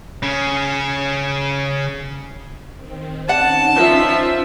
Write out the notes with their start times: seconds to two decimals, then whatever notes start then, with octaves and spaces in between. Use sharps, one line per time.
0.23 C#3 C#4
2.73 D#3 C4
3.28 C#4 D#4 D5 F#5 A5
3.74 F3 E5